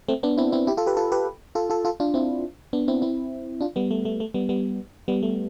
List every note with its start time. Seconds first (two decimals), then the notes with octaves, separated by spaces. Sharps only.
0.08 A3 C4
0.23 B3 D4
0.38 C4 E4
0.52 C4 E4
0.67 E4 G4
0.77 F4 A4
0.86 G4 B4
0.97 F4 A4
1.12 G4 B4
1.55 F4 A4
1.70 F4 A4
1.85 F4 A4
2.00 D4 F4
2.14 C4 E4
2.73 B3 D4
2.88 C4 E4
3.02 C4 E4
3.61 D4 F4
3.76 G3 B3
3.91 A3
4.05 A3
4.20 A3
4.34 G3 B3
4.49 G3 B3
5.08 G3 B3
5.23 A3